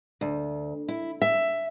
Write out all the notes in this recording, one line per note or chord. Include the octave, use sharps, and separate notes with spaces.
D2
E4
E5